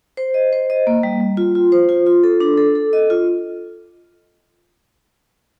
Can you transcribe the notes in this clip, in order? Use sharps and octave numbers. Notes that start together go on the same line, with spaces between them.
C5
D#5
C5
D#5
A#3
G3
G3
F4
F4
C5
F4
F4
A4
D4
A4
A4
D#5
F4